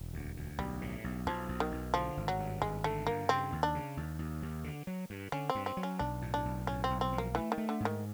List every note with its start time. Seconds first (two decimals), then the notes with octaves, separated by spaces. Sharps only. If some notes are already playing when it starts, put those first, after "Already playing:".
Already playing: E1
0.14 D2
0.36 D2
0.58 B1 G3
0.81 A2
1.04 B1
1.26 B1 F3
1.49 B1
1.60 D#3
1.72 B1
1.94 D3 F3
2.17 G#1
2.28 F#3
2.38 G2
2.62 G#1 G#3
2.84 D3 A3
3.07 G2 A#3
3.29 C#3 C4
3.52 D#2
3.63 D4
3.75 C#3
3.97 D#2
4.19 D#2
4.42 D#2
4.64 D3
4.87 F#3
5.10 G2
5.32 D3 C#4
5.50 C4
5.55 G2
5.66 C4
5.77 F#3
5.83 C#4
5.99 B1 D4
6.22 A2
6.34 D4
6.45 B1
6.67 A2 C#4
6.84 C4
6.90 B1
7.01 C4
7.12 F3
7.18 A#3
7.35 E3 A3
7.52 D#3
7.58 A3
7.69 D3
7.80 G#2 D#3